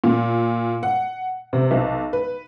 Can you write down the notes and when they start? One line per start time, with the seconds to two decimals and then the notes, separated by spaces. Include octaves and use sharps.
0.04 A#2
0.83 F#5
1.53 C3
1.71 B1
2.13 B4